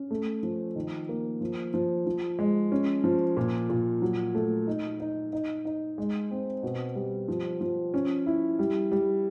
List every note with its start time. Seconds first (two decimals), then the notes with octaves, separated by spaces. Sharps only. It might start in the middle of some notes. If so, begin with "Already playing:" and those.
Already playing: C#4
0.11 A3
0.43 F3
0.76 D#3
1.09 A#3
1.41 F3
1.74 F3
2.06 F3
2.39 G#3
2.72 C#4
3.04 F3
3.37 A#2
3.70 A#2
4.02 F#3
4.35 A3
4.67 D#4
5.00 D#4
5.33 D#4
5.65 D#4
5.98 G#3
6.31 C4
6.63 B2
6.95 G3
7.28 F3
7.61 F3
7.94 C#4
8.26 E4
8.59 G3
8.92 G3